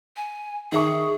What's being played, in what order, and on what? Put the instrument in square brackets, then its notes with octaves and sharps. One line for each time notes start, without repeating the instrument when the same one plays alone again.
[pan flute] G#5
[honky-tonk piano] D#3 E5 C#6 [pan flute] G#4